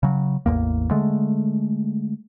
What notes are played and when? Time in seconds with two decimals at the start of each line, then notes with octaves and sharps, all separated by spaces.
0.03 C#3 F#3
0.46 A1 E2 G#2 A#3
0.91 D3 G#3 A3